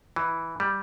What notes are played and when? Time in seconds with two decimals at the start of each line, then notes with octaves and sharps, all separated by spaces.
0.16 E3
0.60 G3